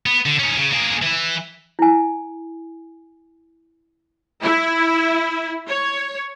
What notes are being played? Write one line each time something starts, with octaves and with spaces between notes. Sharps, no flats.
B3
D3
C#4 D#4
C#3
A#3 G#4
E3 E4
E4 G#5
E4
C#5